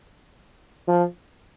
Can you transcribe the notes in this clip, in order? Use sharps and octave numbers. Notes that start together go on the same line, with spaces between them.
F3